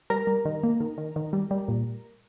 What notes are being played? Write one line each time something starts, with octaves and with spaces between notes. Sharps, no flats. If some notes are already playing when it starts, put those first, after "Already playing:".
G3 A#4 A#5
G3
D#3
A#3
D#3
D#3
D#3
G3
G3
A#2